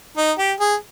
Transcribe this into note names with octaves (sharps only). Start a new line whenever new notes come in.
D#4
G4
G#4